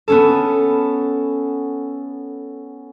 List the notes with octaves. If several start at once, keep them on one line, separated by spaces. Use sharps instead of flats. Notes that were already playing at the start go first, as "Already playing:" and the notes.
B3 C#4 A4